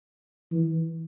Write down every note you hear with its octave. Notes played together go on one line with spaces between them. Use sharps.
E3